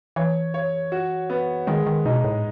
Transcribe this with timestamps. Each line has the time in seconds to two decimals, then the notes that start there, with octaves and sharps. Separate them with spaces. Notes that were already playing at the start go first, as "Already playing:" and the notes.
0.16 E3 C#5
0.54 C#5
0.92 F#4
1.30 B3
1.67 D#3 G#3
1.87 D#3
2.05 B2 D#4
2.24 A2